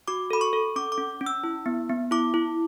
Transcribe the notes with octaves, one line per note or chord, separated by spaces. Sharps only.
F#4 D6
A4 B5
C#6
A4
C#4 D6
D6
C#4
C#4
E6
E4
B3
B3
E4 D6
E4